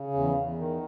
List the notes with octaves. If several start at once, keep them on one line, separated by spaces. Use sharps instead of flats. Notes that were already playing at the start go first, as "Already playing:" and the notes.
Already playing: C#3
E2
E2
D#3